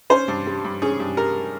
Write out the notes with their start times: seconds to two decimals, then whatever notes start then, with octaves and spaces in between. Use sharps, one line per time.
0.10 C#4 C5
0.28 G2
0.47 G3
0.64 G2
0.82 C#4 G#4
1.00 G2
1.17 G3 A#4